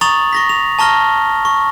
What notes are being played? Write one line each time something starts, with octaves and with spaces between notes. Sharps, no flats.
A#5 C#6 D#6 A6 F7 F#7
C#6 A#6 B6
F7
A5 A#5 C#6 F6 A#6 G7
C#6